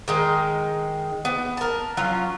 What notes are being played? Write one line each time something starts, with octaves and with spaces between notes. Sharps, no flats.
D#3 G#3 D#4
B3
A#4 A5
F#3 C#4 F4